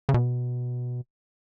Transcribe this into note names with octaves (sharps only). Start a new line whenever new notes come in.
C#3
B2